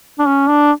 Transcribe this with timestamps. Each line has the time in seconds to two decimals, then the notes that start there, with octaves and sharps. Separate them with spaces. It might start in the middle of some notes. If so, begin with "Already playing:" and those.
0.19 D4
0.27 C#4
0.49 D4